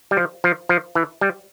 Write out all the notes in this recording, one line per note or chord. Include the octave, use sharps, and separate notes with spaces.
G3
F3
F3
F3
E3
G3